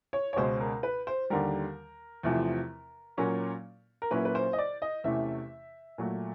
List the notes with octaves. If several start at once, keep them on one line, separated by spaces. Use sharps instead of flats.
C#5
C#5
C#2 B2 G#3 C#4 C5
A#4
B4
C5
D#2 D3 G3 A#4
E2 C3 F3 A3 C4
A#2 F#3 A#3 C#4
A#4
A#2 F#3 A#3 C#4 E4 B4
B4
C5
D#5
D5
D#5
E2 C3 E3 A3 C#4 E5
A#2 F#3 A3